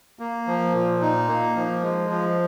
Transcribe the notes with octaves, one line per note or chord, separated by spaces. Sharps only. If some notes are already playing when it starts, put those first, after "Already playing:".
A#3
F3
A#2
D#4
A#3
F3
G#3
F3